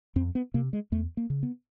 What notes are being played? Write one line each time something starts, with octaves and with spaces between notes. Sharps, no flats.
F2 C4
B3
C3 A#3
G#3
E2 A3
A#3
C#3
B3